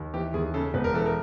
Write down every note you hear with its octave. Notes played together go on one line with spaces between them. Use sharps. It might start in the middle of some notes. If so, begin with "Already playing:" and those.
Already playing: D#2
E3 G4
D#2 G#4
C#3 A4
E1 B4
A#4
E3 A4
A#4